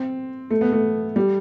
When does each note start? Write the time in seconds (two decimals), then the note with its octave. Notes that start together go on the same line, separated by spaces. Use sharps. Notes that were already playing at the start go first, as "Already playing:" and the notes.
Already playing: C4
0.51 A3
0.61 B3
0.73 A3
1.16 G3